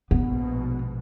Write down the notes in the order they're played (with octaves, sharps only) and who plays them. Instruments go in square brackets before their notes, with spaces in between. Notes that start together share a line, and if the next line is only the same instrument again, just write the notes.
[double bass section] A#1 G#2 B2 [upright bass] B3